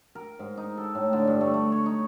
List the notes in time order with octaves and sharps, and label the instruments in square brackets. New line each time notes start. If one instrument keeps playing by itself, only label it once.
[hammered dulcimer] A#4
G#2
D#4
A4
A2
D3
G2
A3
A3
C#5
D#4